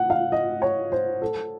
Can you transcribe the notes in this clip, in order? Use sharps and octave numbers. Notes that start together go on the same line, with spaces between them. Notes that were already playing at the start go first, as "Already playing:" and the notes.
Already playing: F#5
F5
D#5
C#5
C5
A4